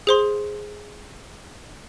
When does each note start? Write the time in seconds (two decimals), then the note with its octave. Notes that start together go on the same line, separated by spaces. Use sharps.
0.07 G#4 C5 C6